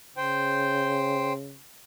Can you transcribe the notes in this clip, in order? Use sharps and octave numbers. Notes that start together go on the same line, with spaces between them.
C#3 C5 G5